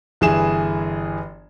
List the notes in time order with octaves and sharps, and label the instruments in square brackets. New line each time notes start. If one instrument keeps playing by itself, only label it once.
[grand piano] G1 E3 G#4 E7